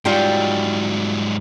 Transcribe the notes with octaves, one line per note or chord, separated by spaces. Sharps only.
G#2 F#3 G3 F4 G5